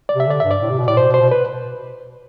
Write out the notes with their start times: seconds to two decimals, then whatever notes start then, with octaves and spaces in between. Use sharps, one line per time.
0.09 D5
0.15 C3 E5
0.27 D3 D5
0.40 G2 E5
0.51 D5
0.62 A2
0.70 C3
0.79 B2
0.88 A2 D5
0.97 B2 C5
1.08 B2
1.14 C5
1.20 B2
1.31 B4